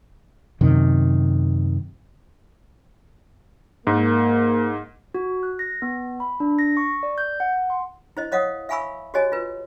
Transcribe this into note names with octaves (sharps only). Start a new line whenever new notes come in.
F#2 C3 D#3
G#2 A#3
F#4
F#6
A#6
B3
B5
D4
A#6
C#6
D5
G6
F#5
C6
E4 C5 D#5
C#5 D#5 F5 F#5 D#6
E5 F5 G#5 B5 C#6 E6
F#4 G4 C#5 D#5 G#5
F4 B4